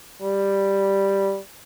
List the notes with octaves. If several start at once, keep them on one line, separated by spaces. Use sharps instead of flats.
G3